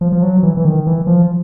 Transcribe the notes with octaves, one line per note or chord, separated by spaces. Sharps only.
F3
F3
F#3
E3
E3
D#3
E3
F3